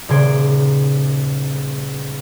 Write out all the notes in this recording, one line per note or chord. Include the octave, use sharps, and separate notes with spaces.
D#1 C#3 C6 G#6 D7